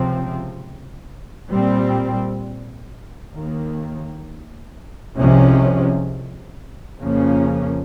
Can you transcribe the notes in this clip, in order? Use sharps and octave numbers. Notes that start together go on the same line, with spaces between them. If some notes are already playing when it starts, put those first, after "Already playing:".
Already playing: C#2 C3 F3 C4
A#2 G3 C4
D#2 D#3 A#3
C2 C3 F3 G#3 C#4
F2 C#3 F3 A#3 C#4